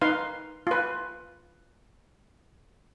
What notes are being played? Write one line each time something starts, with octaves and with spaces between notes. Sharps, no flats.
D#4 B4 F5 C6
F4 B4